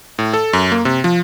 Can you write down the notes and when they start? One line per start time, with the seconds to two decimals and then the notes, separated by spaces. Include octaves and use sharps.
0.19 A2
0.34 A4
0.53 F#2
0.72 A#3
0.85 C3
1.04 F3